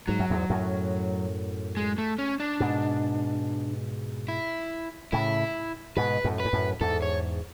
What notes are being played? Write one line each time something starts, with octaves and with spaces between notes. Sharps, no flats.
G#2 F#3
F#2
E2 G#2
F#2 A2
G#3
A3
C#4
D4
G#2 B2
E4
A2 C#3 E4
G#2 B2 B4
F#2 A2
B4
G#2
F#2 A2
E2 G#2 A4
C#5